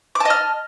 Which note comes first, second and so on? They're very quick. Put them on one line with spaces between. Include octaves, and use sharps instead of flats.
D6 A5 D#5 F6